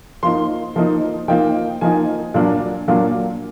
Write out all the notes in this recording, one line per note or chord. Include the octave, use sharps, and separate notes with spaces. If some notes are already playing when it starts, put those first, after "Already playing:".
F3 A#3 D#4 C6
F3 A#3 D#4
F3 A#3 D#4 G5
F3 A#3 D#4 G#5
A#2 F#3 A#3 D4
A#2 F#3 A#3 D4